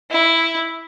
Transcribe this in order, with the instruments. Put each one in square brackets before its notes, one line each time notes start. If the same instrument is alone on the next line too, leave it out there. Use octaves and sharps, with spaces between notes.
[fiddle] E4